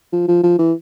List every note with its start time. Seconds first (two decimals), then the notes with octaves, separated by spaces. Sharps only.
0.13 F3
0.28 F3
0.44 F3
0.59 E3